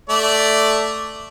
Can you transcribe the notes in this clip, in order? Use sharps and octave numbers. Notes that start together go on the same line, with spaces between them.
A3 D5